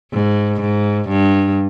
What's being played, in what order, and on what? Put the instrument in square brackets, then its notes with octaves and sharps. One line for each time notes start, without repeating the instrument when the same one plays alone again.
[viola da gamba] G#2
G#2
G2